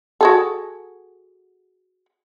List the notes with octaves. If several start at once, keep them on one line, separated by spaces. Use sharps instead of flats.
F#4 G#4 A4